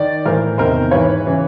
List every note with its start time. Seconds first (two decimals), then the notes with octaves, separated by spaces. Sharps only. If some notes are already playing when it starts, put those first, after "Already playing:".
Already playing: D#3 D5
0.25 A2 E3 A#4 C5
0.58 E2 C3 D#3 A#4 C5
0.91 G#2 E3 B4 C#5
1.27 C#3 E3